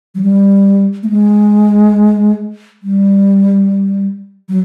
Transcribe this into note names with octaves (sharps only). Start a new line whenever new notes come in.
F#3
G3
A3
G#3
G3
F#3